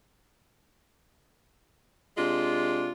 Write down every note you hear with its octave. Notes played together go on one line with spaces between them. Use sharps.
C3 G#3 D4 F4